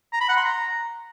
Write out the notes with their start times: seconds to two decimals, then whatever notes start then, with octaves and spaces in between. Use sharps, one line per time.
0.13 A#5
0.21 B5
0.29 F#5
0.37 C6
0.45 A#5